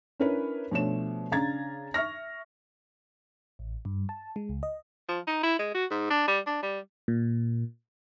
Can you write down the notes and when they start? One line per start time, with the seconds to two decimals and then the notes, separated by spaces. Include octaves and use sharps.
0.20 C#4 D4 E4 A#4 B4 C#5
0.71 B2 F3 A3 D4 C#5 E7
1.31 C#3 D4 F5 A#5 G#6 A6
1.94 E5 C#6 F6 A#6
3.59 A1
3.85 G2
4.09 A5
4.36 G#3
4.49 C#2
4.63 D#5
5.09 F3
5.27 D#4
5.43 E4
5.59 G#3
5.74 F#4
5.91 G#2
6.10 D4
6.28 G3
6.47 D4
6.62 G3
7.08 A#2